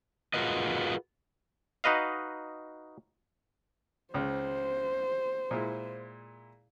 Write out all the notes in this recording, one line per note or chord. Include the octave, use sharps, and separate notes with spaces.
F4 F#4 G#4 A#4 B4 D#5
D#4 F#4 B4 D#5 F5
C#2 C#3 C5
A#2 G#3 E4